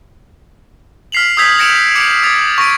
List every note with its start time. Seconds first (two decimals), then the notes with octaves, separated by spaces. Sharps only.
1.12 F6 B6 C7 F7 F#7
1.37 D#6 E6 G6 G#6 B6
1.59 G#6 A#6 C#7 D7 E7 F#7
1.95 D6 C#7 D7
2.23 D#6 A6
2.58 C#6 A#6 D7